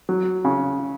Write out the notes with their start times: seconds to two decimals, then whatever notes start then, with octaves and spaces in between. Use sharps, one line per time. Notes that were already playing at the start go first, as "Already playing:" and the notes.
0.09 F#3
0.45 C#3